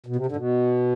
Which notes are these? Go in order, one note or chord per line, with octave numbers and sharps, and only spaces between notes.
B2
C3
D3
G#2
B2